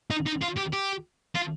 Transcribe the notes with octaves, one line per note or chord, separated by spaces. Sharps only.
D#4
D#4
F4
G4
G4
F4